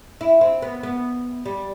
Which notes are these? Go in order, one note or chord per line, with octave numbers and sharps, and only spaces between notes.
E4
C4
B3
B3
G3